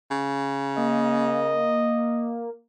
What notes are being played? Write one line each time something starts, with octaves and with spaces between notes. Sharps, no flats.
C#3
A#3 D#5